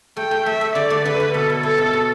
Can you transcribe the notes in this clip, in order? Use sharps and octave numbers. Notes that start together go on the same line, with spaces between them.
A3 G5
A3
A3 E5
A3
D3 D5
A3
D3 B4
D3
B2 A4
E4
E4 A4
B2
B2